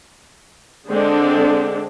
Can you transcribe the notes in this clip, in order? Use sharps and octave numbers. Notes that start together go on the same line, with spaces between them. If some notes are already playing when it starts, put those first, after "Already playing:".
D3 G#3 C4 D4 A4